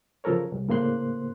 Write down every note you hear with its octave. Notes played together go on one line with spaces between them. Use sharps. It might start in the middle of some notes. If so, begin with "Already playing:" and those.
C#3 F3 A4 A#4 C#5
C2
A2 C#3 A#3 C5 C6 F#6